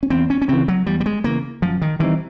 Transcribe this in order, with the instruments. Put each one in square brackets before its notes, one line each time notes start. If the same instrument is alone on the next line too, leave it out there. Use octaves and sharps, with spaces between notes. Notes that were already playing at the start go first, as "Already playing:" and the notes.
[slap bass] C#4
[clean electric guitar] E2 [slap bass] C4
[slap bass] C#4
C#4
[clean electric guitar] C#3 E3 [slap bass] C4
[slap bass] F#3
[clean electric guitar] E2 [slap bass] G3
[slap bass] G3
G#3
[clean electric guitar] C#3 E3 [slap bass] A#3
[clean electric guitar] F#2 [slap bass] F3
[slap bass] D#3
[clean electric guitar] D#3 G3 C4 D#4 [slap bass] E3